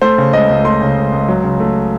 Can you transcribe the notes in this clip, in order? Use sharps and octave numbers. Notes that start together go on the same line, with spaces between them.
A3 C5
C#3
C#2 D#5
C#2
A3 C6
C#3
C#2
C#2
F#3
C#3
A3